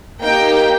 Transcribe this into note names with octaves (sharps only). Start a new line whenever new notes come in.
A#3 D#4 G4 G5